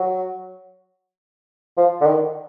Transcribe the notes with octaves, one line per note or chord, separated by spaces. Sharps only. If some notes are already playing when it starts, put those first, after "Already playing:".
Already playing: F#3
F3
D3
D#3